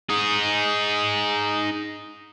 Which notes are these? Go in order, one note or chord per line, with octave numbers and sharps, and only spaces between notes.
D#4 G#4